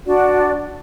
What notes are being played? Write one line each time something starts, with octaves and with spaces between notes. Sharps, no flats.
D4 F#4 D5